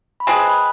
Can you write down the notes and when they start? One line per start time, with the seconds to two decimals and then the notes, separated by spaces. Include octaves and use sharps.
0.20 B5
0.27 G#3 C4 G#4 B4 A5
0.46 B5